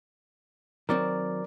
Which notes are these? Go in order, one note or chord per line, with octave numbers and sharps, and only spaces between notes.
D#3 F#3 C4 A#4 D5